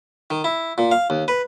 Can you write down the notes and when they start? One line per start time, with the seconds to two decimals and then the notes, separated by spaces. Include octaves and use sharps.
0.30 D#3
0.44 E4
0.78 A#2
0.91 F5
1.10 D#2
1.28 B4